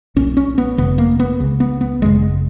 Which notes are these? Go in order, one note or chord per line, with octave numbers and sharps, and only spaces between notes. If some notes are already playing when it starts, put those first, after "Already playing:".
B1 A#2 C#4
C#4
B3
G#1 F#2 C#3 B3
A#3
B3
C#2 C#3
B3
B3
G#1 F#2 C#3 G#3